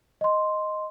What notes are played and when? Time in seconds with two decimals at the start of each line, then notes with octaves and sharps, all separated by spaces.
0.21 D#5 C6